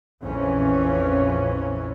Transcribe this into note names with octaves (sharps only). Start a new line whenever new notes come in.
A#1 F2 E3 C#4